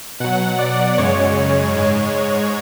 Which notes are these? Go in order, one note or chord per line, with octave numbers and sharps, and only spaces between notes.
B2 F#3 F#5
D5
F#2 C#3 G#3 C#5
G#2 G#3